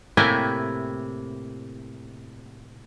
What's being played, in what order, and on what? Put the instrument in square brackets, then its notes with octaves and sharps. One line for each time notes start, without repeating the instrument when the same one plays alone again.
[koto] A2 C3 A#3 E4 G5 G#5